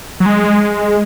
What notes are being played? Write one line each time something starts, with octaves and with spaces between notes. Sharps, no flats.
F#3
G#3